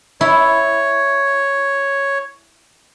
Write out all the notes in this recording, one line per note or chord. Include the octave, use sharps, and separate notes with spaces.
E4 C#5